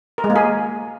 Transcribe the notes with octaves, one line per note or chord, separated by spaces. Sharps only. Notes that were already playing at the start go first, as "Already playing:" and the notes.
A#4
G#3
A#3
G#4